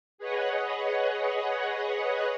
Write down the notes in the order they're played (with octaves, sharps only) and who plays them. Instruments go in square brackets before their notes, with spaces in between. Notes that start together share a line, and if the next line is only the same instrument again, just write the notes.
[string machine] G#4 B4 C#5 D#5 F#5